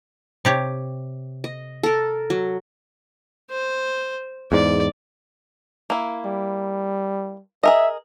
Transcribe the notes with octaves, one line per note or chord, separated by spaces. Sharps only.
C3 G4 C#5
D#5
A4 A#4
F#3
C5
E2 G#2 D5
A#3 E4
G3
G#4 A#4 D#5 E5